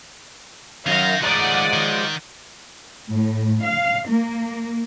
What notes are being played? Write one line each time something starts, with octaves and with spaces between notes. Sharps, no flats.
F#2 D#3 F5 A#6
D#3 F3 G#3 A3 D5 F#5 A#5 D#6
D#3
A2
F5
A#3